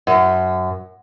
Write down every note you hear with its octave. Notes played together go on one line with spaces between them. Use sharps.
F#2